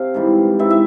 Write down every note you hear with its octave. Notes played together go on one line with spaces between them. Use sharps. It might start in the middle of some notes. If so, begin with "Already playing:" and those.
Already playing: C3 F5
G#2 E3 G3
G#2 E3 G3 E5
E5